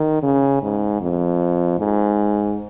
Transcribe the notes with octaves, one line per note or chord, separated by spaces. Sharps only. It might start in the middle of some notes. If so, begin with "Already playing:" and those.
Already playing: D#3
C#3
G#2
F2
G#2